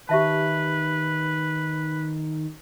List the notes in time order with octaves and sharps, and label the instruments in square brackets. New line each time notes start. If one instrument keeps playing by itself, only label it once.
[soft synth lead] D#3 [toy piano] G4 E5 A5 [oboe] B4